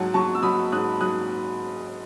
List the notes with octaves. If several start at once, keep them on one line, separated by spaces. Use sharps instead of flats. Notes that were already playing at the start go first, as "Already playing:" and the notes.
Already playing: G#2 F#3 F#5 A5
F#3 A5 C#6
E6
F#3 B5 D#6
G#2 D#6 F#6
F#3 D#6 F#6